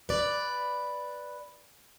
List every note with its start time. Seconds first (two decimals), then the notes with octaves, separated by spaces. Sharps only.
0.09 B4 D5